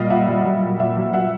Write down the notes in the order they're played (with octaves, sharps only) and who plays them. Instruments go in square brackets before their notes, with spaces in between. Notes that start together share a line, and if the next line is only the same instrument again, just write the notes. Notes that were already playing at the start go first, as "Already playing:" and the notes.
Already playing: [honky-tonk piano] A#2 G3 D#5 F5
A#2 E5 F#5
G3
F#3
A#2
A#2 E5 F#5
F#3
F#3 E5 F#5